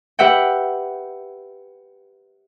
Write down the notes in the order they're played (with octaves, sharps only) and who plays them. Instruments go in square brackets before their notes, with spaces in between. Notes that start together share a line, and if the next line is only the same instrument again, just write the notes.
[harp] G4 B4 E5 F#5 G5